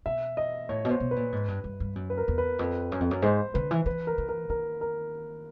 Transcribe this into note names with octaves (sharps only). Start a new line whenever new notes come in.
B2 E5
D#5
A2 C#5
B2
C5
B2
B4
A#2
G#2
G2
G2
G2
F#2
B4
A#4
E2
B4
F2
F#2
F2
F#2
G#2 C5
D3 B4
E3
E3 B4
A#4
E3
A#4
D#3 A#4
A#4